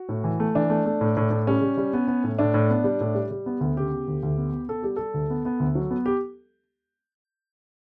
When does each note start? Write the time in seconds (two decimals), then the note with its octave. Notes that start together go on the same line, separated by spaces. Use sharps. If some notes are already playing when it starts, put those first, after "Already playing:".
Already playing: F#4
0.09 A2
0.24 E3
0.40 A3
0.55 E3 D4
0.70 A3
0.86 A3
1.01 A2
1.17 A2
1.31 A2
1.47 G3 C#4
1.62 G3
1.77 G3
1.93 B3
2.08 B3
2.24 A2
2.39 A2 D4
2.54 A2
2.70 B3
2.84 G3
3.01 A2
3.15 G3
3.31 G3
3.46 B3
3.61 D2
3.76 C#3 G4
3.91 B3
4.08 D2
4.23 D2
4.38 B3
4.53 B3
4.69 B3 A4
4.83 G3 G4
4.96 G3 A4
5.14 D2
5.30 B3
5.45 B3
5.60 D2
5.75 F#3
5.91 B3
6.06 G4